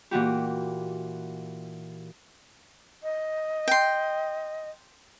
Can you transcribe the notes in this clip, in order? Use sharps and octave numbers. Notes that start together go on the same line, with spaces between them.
A#2 E3 F#4 G4
D#5
G5 C6